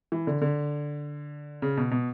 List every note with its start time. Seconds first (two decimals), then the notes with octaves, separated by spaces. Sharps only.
0.12 E3
0.27 D3
0.42 D3
1.62 C#3
1.77 B2
1.91 B2